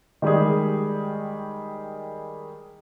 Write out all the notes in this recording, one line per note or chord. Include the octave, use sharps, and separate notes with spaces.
D#3 G3 G#3 G#4